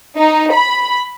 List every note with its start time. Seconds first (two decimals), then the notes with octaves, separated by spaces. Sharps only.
0.17 D#4
0.54 B5